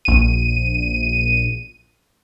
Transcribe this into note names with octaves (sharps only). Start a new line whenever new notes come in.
A#1 D#7